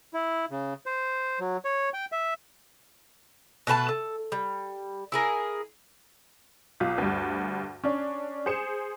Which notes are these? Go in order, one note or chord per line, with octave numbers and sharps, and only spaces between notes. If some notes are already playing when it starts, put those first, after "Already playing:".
E4
C#3
C5
F#3
C#5
G5
E5
B2 A3 B4 A5
A4
G3
E4 G#4 A#4
B1 F4
D2 G2
C#4 D4
G#4 C5 C#7 E7